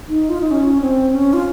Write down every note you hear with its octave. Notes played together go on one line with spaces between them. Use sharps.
D#4
F4
D#4
C#4
C4
C#4
F4